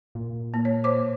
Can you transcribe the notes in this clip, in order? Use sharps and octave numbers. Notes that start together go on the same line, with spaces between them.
A#2
A#3
C#5
C5 C#5 D6